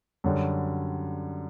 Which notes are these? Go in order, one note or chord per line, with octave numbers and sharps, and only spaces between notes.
F#2 D3 G3